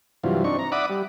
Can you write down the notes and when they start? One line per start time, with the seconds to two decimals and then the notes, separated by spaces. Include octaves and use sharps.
0.24 G2 C3 E3 F#3 F4
0.44 C4 D4 D#4 C#6
0.59 A#5
0.72 D5 E5 F#5 B5 D6 D#6
0.90 G3